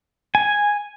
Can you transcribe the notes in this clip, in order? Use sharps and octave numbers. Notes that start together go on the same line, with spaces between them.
G#5